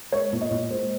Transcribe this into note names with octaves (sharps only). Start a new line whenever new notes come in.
G#3 C#5
A#2
D#5
A#2
G#3 C5